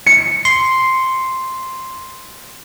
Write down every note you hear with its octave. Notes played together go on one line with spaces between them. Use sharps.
C#7
C6